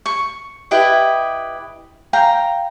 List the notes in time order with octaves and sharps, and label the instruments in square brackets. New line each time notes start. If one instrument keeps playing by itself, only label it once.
[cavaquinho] C#6
E4 G4 B4 D#5
F5 G5 A#5